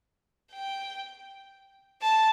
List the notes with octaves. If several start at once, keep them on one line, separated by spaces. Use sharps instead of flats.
G5
A5